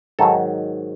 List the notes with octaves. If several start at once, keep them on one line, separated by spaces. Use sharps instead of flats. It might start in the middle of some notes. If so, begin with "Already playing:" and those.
G#2 D#3 F#3 A4